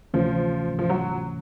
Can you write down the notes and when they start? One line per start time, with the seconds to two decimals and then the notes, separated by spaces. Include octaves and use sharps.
0.14 D2 C3 E3 F3 A3 C#4
0.79 F3
0.89 F#3